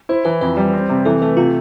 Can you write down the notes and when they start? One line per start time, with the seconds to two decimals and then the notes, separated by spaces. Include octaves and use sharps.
0.09 E4 C5
0.25 E3 B4
0.41 F2 B4
0.57 G3
0.73 C4
0.89 C3
1.05 E3 A4
1.22 A3 A4
1.37 C3 F4